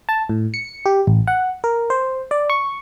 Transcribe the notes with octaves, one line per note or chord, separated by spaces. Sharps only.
A5
A2
C#7
G4
A1
F#5
A#4
C5
D5
C#6